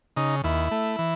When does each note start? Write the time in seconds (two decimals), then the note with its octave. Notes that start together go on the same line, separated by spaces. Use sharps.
0.17 C#3 D#4
0.44 D#2 E4
0.71 A3
0.99 E3